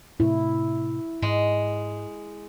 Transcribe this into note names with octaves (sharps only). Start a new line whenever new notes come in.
A2 C3 A3 E4
G#2 G#3